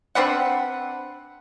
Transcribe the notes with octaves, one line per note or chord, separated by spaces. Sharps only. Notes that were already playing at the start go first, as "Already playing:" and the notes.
C4 D4 B4 F#5